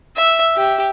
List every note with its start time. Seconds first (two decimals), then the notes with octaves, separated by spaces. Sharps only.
0.17 E5
0.57 G4